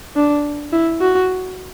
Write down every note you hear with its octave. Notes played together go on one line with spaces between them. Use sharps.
D4
E4
F#4